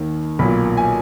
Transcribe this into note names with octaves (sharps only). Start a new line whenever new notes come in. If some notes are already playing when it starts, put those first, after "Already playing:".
Already playing: D#2 D#3
B1 A#2 B5
G#5